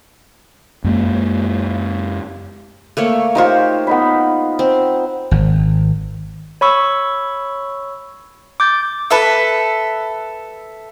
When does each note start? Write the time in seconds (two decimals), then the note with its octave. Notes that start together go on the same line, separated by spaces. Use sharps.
0.84 F#2 G#3 A#3
2.97 A3 A#3 C#5
3.35 D#4 F4 G4 C5 C#5
3.87 B3 D#4 B5
4.59 C4
5.31 G#1
6.61 C#5 B5 C#6 E6
8.60 D6 G6 A6
9.10 A4 B4 E5